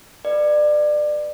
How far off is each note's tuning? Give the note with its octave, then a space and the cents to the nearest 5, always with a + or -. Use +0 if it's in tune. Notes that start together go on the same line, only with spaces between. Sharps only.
B4 +0 D5 +25